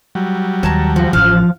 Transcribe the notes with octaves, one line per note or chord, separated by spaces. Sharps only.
F#3 G3
D#2 C#5 A5 A#5
F3 F#4
A1 F5 F#5